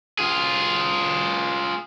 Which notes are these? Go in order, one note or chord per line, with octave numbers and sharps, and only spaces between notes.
F4 G#4